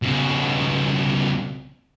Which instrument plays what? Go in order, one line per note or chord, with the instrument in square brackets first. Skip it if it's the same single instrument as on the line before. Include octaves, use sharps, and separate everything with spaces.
[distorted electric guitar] C#2 B2